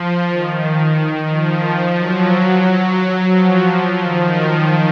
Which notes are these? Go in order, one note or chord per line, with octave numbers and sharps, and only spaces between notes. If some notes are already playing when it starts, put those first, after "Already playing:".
Already playing: F3
D#3
F3
F#3
F3
D#3